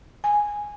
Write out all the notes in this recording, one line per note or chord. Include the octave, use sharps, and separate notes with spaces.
G#5